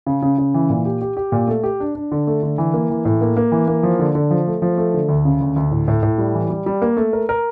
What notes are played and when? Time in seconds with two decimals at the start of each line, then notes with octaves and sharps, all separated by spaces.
0.07 C#3
0.22 C#3
0.38 C#3
0.54 E3
0.70 A#2
0.85 G4
1.01 G4
1.17 G4
1.32 A#2
1.48 A3
1.63 G4
1.80 D4
1.95 D4
2.12 D3
2.27 A3
2.43 D3
2.58 E3
2.74 A#3
2.90 E3
3.05 A2
3.21 A#3
3.37 A#3
3.52 E3
3.68 A#3
3.83 F3
3.99 D3
4.15 D3
4.31 F3
4.47 A3
4.62 F3
4.78 A3
4.94 D3
5.09 D2
5.25 C#3
5.41 D2
5.56 D2
5.71 A2
5.88 A2
6.03 A2
6.18 G3
6.34 E3
6.50 G3
6.66 G3
6.82 A#3
6.97 A3
7.13 A#4
7.29 A#4